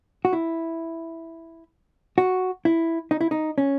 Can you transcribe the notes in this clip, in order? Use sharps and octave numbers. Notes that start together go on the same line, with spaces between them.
F#4
E4
F#4
E4
D#4
E4
D#4
C#4